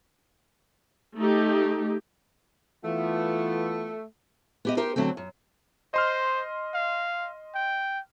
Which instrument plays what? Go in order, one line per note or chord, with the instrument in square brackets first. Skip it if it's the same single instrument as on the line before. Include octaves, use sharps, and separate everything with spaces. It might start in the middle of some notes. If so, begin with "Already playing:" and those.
[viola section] A3 D#4 G4
[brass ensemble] E3 B3 F4 [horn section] A3
[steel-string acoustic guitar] B3 G4 D#5
D#4 G4 A#4 C5
D3 F#3 A3 C4
F#2
[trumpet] C5 [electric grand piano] D#5 C6 F6
[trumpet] F5
G5